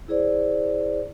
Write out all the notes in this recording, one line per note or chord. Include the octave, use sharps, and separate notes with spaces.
E4 G#4 C5 D5